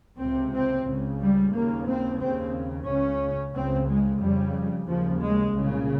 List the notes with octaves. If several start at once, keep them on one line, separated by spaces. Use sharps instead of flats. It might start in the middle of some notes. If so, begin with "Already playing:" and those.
C#2 C3 C4
C4
C#2 C#3
G3
D#2 C#3 A#3
C4
D#2 C#3 C4
C#2 C#3 C#4
C#2 C#3 C4
G#3
F2 C#3 G3
D#2 C#3 F3
G#3
C2 A#2 C#3